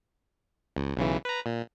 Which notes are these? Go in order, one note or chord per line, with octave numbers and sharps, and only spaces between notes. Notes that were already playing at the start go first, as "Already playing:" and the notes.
C#2
B1 C#3 E3
B4 A#5
A#2